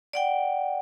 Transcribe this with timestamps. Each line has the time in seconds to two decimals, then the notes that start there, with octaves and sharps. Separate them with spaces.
0.13 D5 F#5 G5